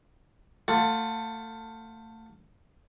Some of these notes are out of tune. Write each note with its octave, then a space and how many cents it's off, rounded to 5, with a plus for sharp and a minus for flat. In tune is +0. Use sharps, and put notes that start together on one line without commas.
A3 +25 F4 +5 F#5 +0